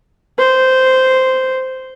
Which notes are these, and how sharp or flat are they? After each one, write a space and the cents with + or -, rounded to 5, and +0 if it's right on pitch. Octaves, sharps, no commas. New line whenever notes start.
C5 -10